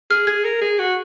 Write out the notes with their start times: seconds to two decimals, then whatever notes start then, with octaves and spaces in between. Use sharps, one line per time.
0.10 G#4 F6
0.27 G#4 G#6
0.44 A#4
0.61 G#4
0.79 F#4